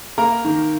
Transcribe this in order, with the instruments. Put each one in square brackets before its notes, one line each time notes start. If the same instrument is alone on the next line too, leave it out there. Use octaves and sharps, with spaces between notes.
[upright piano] A#3 A#4 A#5
D#3